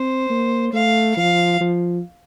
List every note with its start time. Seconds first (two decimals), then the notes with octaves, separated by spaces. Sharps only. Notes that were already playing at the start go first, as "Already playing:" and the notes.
Already playing: C4 C5
0.30 A#3
0.73 A3 F5
1.17 F3 F5
1.61 F3